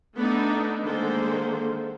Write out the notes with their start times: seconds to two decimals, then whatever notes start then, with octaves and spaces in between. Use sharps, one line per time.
0.14 A3 B3 D4 D#4
0.84 D3 D#3 G#3 A#3 C5